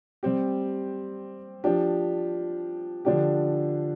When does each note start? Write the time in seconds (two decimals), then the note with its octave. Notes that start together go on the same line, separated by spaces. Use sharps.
0.23 G3 C4 G4
1.64 F3 D4 G4
3.05 D3 F3 D4 G4